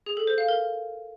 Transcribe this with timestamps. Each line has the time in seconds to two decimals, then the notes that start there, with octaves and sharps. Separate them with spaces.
0.06 G#4
0.17 A4
0.27 C5
0.38 F5
0.48 A#4